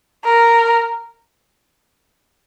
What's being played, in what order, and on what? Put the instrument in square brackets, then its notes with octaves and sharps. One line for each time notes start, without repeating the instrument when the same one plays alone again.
[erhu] A#4